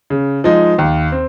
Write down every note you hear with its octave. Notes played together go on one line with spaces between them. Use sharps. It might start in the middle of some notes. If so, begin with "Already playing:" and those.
C#3
F3 G#3 D#4
D#2
C4